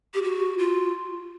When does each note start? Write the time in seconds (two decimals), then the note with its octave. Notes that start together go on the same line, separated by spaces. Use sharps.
0.14 G4
0.23 F#4
0.58 F4